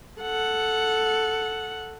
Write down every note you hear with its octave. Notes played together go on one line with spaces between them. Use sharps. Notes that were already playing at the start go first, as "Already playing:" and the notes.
A4 F#5